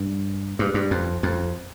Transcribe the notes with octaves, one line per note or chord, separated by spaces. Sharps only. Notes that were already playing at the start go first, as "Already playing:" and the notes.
Already playing: G2
G2
G2
F2
F2